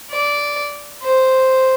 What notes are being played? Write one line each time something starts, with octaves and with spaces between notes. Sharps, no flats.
D5
C5